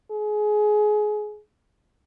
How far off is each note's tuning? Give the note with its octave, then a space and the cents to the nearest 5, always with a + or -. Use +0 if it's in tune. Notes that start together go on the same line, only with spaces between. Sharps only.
G#4 +25